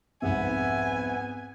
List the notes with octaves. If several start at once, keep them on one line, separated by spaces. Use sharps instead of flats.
C2 F2 G#2 B3 E5 G#5